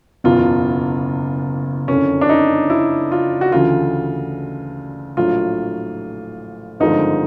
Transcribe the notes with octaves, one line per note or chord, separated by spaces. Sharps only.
F#1 E2 B2 F4
F#1 F2 D3 C#4
D4
D#4
E4
F4
F#4
D2 C#3 E3 F4
A#1 A2 F#3 F4
G#1 G2 D3 F3 G#3 D#4